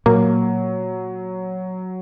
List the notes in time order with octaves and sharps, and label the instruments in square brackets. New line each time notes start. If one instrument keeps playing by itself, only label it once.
[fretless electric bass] A#2 [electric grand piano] F#3 [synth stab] A#3